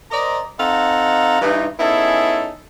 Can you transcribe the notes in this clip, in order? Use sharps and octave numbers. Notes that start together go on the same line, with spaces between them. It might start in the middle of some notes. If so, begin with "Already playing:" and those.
A#4 C5 D5 D#5 A#5
C4 D#4 A4 F5 F#5 A#5
G2 E3 D#4
B3 C#4 D#4 E4 G#4 A4